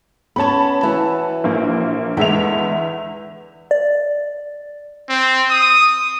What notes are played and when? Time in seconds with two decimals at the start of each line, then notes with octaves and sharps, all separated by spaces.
0.36 B3 C#4 C#5 A5 B5
0.83 E3 F#4
1.44 A#1 A#3
2.17 E2 D3 G#3 E5 F7
3.71 D5
5.09 C4
5.50 D#6